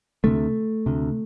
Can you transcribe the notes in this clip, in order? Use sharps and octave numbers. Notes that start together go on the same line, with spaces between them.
D2 C3 A3
D2 C3